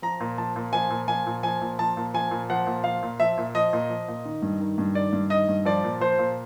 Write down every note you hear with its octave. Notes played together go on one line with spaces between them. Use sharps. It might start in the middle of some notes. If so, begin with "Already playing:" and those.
F3 A#5
A#2
F3 A5
A#2
F3 G#5
A#2
F3 G#5
A#2
F3 G#5
A#2
F3 A5
A#2
F3 G#5
A#2
F3 F#5
A#2
F3 F5
A#2
F3 E5
A#2
F3 D#5
A#2
F3
A#2
D#3
G2
D#3
G2
D#3 D5
G2
D#3 D#5
G2
F3 D5
A#2
F3 C5
A#2